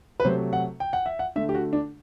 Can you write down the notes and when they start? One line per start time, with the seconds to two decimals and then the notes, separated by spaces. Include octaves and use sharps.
0.20 B4
0.25 C3 F#3 A3 C5
0.53 F#5
0.80 G5
0.93 F#5
1.06 E5
1.19 F#5
1.36 D3 A3 E5
1.49 G4
1.54 F#4
1.73 D4